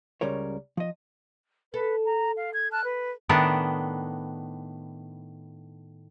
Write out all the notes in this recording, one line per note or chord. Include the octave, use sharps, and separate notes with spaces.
C#2 C#3 G3 A#4 C#5
F3 D#5
A4 B4
A#5
F5
G#6
A5 F6 F#6
B4
A2 D#3 B3 D4